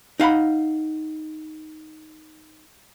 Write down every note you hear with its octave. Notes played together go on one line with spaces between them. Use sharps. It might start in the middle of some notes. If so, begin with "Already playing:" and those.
D#4 F5 F#5 B5